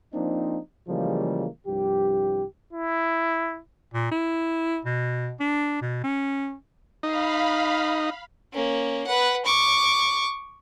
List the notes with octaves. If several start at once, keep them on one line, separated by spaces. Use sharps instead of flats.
F3 A#3 C4 D4 D#4
C#3 E3 F3 G3 G#3 A#3
C2 G2 F3 G4
E4
A#2
E4
B2
D4
B2
C#4
D#4 F5 B5
A#3 C#4
B4 F#5
C#6 D6